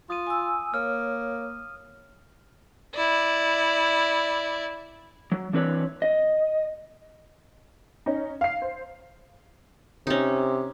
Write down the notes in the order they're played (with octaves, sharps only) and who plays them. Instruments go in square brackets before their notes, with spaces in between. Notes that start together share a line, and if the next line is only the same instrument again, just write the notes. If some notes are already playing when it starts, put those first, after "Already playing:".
[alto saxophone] F4 [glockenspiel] D#6 D#7
[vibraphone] G#5 E6
[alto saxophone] A#3 [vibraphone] C#5 [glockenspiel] F6
[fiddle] E4 D5
[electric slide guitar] F#3
E3 C4 D4 B4 C#5
D#5
[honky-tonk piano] C#4 D#4
F5 C7
C5
[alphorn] C3 [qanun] C#4 D#4